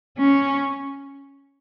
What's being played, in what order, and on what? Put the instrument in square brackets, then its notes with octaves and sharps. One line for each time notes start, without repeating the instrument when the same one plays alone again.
[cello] C#4